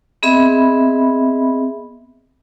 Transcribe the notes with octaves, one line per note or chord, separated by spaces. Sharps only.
B3 C4 G#4 D#5 E5 B5